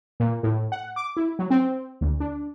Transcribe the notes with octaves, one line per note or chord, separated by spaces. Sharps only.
A#2
A2
F#5
D6
E4
F#3
C4
D2
D4